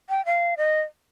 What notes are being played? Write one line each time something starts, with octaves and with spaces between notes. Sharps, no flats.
G5
F5
D#5